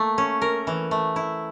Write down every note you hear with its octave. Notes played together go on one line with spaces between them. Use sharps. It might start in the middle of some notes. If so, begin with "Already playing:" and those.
Already playing: A3 A#3
C#4
A#4
E3
A3
E4